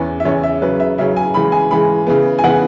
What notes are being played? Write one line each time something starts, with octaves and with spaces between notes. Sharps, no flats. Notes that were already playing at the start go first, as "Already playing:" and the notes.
Already playing: E2 E3 C#4 B4
E5
E2 E3 C#4 C#5
E5
C#3 F#3 C#4 B4
E5
C#3 F#3 C#4 E5
G#5
C#3 E3 G#3 B5
G#5
C#3 E3 G#3 B5
C#3 E3 B3
G#5
C#3 E3 B3 F#5